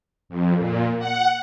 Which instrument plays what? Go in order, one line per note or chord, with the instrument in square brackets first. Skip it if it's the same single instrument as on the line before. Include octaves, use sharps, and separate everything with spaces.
[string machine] F2
A#2
F#5